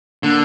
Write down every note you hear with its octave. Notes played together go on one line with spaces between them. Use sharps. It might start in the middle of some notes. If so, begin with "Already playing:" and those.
D3 A#3 D4